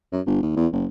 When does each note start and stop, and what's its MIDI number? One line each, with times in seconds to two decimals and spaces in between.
0.12 0.21 42
0.26 0.42 31
0.43 0.53 39
0.56 0.67 40
0.73 0.86 30